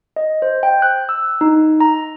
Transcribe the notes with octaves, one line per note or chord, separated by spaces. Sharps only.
D#5
C5
G5
F#6
E6
D#4
A#5